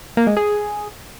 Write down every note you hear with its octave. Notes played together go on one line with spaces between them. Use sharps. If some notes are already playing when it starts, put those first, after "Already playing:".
A#3
G#3
G#4